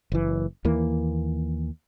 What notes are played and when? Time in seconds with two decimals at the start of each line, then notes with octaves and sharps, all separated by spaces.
0.12 F#1 E3
0.65 D#2 E3 A#3